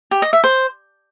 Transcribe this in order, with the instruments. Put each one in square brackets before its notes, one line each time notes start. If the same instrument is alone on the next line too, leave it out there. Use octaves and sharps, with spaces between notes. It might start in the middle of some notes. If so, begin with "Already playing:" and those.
[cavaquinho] G4
D#5
E5
C5